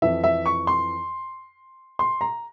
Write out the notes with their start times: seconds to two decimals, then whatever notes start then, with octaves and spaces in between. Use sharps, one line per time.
0.02 F2 E3 E5
0.24 E5
0.46 C#6
0.67 C6
1.99 C6
2.21 A#5